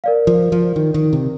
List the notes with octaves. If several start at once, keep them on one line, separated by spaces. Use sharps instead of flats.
A#4 D5 F5
F3
F3
D#3
D#3
C3